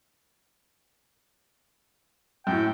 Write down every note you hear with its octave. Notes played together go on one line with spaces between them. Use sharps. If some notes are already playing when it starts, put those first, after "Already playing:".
F#2 A2 G5